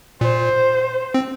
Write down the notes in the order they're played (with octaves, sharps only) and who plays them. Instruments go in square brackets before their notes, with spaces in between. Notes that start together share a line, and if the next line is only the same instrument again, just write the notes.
[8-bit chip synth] A#2 [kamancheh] C5
[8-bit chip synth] C4